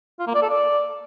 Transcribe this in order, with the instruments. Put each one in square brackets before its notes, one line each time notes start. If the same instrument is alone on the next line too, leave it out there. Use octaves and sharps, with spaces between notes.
[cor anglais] F4
A#3
D5
A4
D5